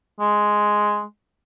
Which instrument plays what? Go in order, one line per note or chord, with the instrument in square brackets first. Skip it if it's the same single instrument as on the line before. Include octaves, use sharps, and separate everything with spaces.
[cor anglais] G#3